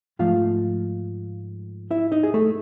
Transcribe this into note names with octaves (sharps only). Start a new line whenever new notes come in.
G#2 F3 A3 F4 F5
E4 E5
D#4 D#5
G#4
A3 A4